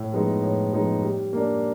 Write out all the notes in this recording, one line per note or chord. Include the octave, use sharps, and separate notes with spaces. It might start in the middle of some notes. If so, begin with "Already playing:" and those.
Already playing: A2
F3 G#3 B3 D#4
A2
F3 G#3 B3 D#4
G3
A#3 D4